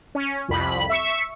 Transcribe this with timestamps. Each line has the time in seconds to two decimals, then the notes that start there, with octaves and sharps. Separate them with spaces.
0.15 C#4
0.48 C2 F2 B5
0.90 E5 C#6